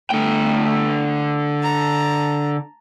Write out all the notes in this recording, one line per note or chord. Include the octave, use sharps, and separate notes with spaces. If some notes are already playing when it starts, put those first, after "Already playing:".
D3 A3 G5
A5 A#5